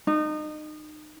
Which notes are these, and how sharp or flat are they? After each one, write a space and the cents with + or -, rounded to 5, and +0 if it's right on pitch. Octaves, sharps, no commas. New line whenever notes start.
D#4 -30